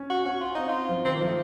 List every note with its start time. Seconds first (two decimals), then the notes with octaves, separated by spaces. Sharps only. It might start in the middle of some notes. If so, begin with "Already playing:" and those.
Already playing: C#4
0.09 F#4
0.25 C#4 F#4
0.41 F4
0.55 C4 D#4
0.68 F4
0.89 F3
1.05 D#3 C4
1.15 A#3
1.21 F3
1.26 A3